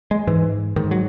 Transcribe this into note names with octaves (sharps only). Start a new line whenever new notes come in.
G#3
G#2 E3
G#2 D#3
F#3